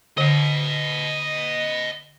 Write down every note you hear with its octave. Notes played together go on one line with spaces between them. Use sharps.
D3 D#5 F#5